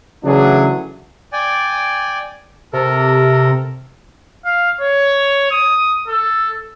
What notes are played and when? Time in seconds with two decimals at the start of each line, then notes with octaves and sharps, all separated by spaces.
0.24 C#3 E3 F#3 A3 D4 G#4
1.33 D5 G5 G#5
2.73 C3 A4 A#4
4.45 F5
4.81 C#5
5.51 D#6
6.08 A4